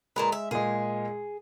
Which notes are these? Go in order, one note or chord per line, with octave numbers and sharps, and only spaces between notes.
A#2 G#3 A#4 B4
E5
A#2 G#3 G#4